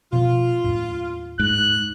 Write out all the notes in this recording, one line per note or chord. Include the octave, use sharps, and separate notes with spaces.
B2 F3 B3 F4
D#2 A2
G#2 F#6